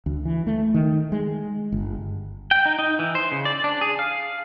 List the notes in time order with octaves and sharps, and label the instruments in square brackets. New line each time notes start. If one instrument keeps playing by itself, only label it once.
[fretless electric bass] D2
E3
A3
D#3
G#3
G1
[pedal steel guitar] G5
D#4
D#4
E3
C5
C#3
D5
D4
G#4
F5